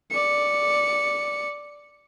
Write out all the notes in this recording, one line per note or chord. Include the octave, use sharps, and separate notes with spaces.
D5 C#7